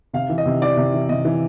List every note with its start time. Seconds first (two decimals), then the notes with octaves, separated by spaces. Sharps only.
0.13 C3 F5
0.29 E3
0.38 D#5
0.46 C3
0.61 E3 D5
0.77 C3
0.94 E3
1.09 C3 D#5
1.25 E3